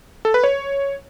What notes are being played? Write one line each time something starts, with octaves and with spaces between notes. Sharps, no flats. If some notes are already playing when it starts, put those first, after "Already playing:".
A4
B4
C#5